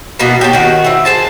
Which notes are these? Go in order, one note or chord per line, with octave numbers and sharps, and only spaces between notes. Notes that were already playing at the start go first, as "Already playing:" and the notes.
B2 E3 A#3 B3
G4 C#5 A5
D#3 F#4
C4 E4
G#4 A4 C5 A5